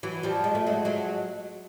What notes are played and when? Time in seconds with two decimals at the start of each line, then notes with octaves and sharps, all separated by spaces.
0.03 E3 F#3
0.23 F3 G3
0.44 G#3
0.55 A3
0.67 F#3 G#3
0.85 F#3 G#3